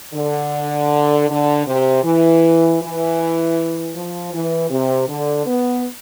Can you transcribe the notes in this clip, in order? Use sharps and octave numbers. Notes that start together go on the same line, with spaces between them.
D3
D3
C3
E3
E3
F3
E3
C3
D3
B3